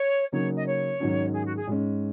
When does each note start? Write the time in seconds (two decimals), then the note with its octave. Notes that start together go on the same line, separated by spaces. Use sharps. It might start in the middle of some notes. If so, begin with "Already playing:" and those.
Already playing: C#5
0.32 C#3 F#3 A#3 D#4 C#5
0.55 D#5
0.66 C#5
1.00 G#2 D#3 F#3 C#4
1.34 G#4
1.45 F#4
1.56 G#4
1.67 G#2 G#3 C#4